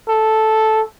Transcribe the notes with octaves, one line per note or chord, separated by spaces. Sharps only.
A4